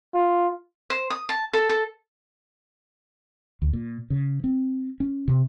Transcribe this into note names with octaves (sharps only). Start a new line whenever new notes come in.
F4
C5
D#6
A5
A4
A4
D2
A#2
C#3
C4
C#4
C3